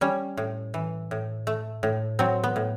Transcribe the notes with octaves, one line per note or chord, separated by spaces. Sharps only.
G3 C#4
A2
E3
A2
A3
A2
F#3 C4
B3
A2